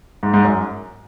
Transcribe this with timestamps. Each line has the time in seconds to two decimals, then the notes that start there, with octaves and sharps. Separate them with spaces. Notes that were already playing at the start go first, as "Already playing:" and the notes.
0.23 G#2
0.34 G#2
0.44 F#2